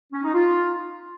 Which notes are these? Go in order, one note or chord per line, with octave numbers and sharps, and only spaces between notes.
C#4
D#4
F4